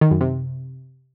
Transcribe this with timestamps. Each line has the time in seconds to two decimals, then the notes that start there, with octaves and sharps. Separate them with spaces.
0.01 D#3
0.11 F#2
0.21 C3